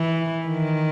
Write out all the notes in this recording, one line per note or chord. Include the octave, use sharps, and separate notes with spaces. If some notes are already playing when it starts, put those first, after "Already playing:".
Already playing: E3
D#3